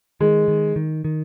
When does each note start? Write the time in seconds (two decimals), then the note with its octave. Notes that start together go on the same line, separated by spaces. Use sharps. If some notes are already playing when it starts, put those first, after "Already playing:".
0.20 D#3 G#3
0.48 D#3
0.76 D#3
1.04 D#3